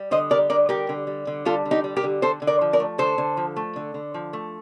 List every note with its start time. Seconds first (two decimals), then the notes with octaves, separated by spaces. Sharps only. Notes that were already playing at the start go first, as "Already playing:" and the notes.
Already playing: G3
0.11 D3 C5 D#5
0.31 G3 A#4 D5
0.50 D3 A#4 D5
0.69 G3 G4 A#4
0.89 D3
1.07 G3
1.27 D3
1.45 G3 F4 A4
1.65 D3
1.71 D#4 G4
1.84 G3
1.96 G4 A#4
2.03 D3
2.22 D3 A4 C5
2.42 D3
2.47 A#4 D5
2.61 F3
2.73 A#4 D5
2.80 A3
2.98 D3 A4 C5
3.18 D3
3.37 F3
3.56 A3
3.76 D3
3.94 D3
4.14 F3
4.33 A3